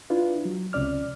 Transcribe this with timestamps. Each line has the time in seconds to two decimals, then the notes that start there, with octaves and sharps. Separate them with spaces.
0.10 D4 E4 F4 B4
0.45 F#3
0.73 C#2 C3 C#4 D5 F6